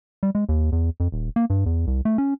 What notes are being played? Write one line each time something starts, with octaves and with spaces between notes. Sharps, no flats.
G3
G#3
D#2
E2
F2
D#1
A#3
G2
E2
C2
A3
C#4